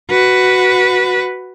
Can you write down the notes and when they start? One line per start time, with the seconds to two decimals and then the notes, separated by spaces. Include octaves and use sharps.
0.10 F#4 B4